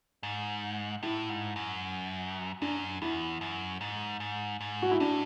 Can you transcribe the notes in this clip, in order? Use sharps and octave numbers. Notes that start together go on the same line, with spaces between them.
G#2
A2 E4
G#2
F#2
F#2 D4
E2 E4
F#2
G#2
G#2
G#2
F#4
E4
A2 D4